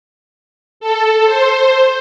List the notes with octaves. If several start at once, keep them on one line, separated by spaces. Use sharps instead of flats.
A4
C5